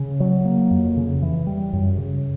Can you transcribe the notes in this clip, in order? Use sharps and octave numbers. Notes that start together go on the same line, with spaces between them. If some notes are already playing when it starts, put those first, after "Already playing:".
Already playing: C#3
F#3
A#3
F2
C#3
E3
G3
F#2
C#3